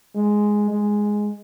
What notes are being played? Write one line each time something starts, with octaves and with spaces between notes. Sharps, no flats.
G#3
G#3